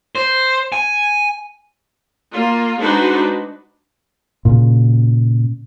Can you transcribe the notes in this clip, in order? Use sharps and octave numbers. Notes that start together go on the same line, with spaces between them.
C5
G#5
A#3 F4
G#3 D4 D#4 F#4 B4 C5
A#2 C#3